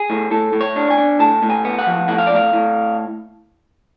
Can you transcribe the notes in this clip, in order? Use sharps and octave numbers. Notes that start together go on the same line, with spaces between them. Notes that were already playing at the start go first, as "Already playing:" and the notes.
Already playing: G#4
A2
A2 A4
A2
C#5
D4
G#5
D4
A2 A5
A2
G#5
B3
F#5
F3
A2 F#5
F5
D5
A2 F5
A2